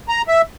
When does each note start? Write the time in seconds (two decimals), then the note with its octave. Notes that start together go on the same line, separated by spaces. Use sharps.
0.09 A#5
0.28 E5